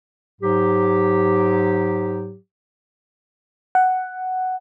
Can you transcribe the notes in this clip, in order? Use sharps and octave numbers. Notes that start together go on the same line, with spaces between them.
G#2 F#3 G4
F#5